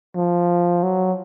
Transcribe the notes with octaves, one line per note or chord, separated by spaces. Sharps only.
F3
F#3